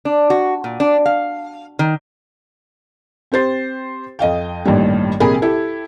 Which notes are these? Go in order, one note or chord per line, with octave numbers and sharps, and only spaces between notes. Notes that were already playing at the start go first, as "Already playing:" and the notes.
D4
F#4
A#2
D4
F5
D#3
C4 G4 C5 A6
F2 D#5 F5 G5
A1 G2 A#2 D#3 G3
A#1 C3 G#4 A#4 G#5 B5
E4 G4 A4